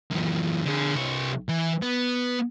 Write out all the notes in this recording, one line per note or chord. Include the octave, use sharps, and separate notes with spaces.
F#2 E3
D3 G#4
C2 C#5
E3
B3